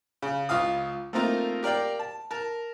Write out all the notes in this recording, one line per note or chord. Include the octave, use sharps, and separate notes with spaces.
C#3
C#2 F4 F5 D#6
A3 A#3 C4 D#4 F4 A#4
G4 A#4 D5 F5 G5
A5
A#4 A5